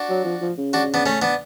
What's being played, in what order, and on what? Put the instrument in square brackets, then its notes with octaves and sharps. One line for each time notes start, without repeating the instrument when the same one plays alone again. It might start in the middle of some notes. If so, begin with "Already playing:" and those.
Already playing: [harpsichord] D4 F#4
[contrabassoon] F#3
F3
F3
C#3
[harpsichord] D4 F#4
B3 D4
A3 C#4
B3 D4